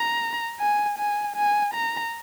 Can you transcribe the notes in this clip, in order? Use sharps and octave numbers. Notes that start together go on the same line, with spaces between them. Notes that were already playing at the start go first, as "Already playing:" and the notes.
Already playing: A#5
G#5
G#5
G#5
A#5